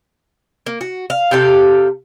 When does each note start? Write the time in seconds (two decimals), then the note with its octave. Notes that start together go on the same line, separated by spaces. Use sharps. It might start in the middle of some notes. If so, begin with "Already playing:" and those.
0.66 A#3
0.81 F#4
1.10 F5
1.31 C3 G4 A4 F5